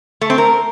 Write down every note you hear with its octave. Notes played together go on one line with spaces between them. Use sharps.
A3
C4
A#4